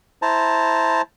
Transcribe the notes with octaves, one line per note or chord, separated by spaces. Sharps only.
E4 C5 A5 A#5